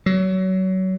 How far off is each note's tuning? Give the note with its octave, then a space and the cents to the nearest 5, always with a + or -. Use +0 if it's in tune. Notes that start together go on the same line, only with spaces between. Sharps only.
F#3 +25